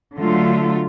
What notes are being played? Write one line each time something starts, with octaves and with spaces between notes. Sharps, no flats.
D3 F#3 A3 F4